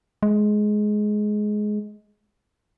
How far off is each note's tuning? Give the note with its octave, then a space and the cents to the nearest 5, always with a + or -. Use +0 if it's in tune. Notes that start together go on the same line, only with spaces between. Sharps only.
G#3 +15